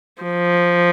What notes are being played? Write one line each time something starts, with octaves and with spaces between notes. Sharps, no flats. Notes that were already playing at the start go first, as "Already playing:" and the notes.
F3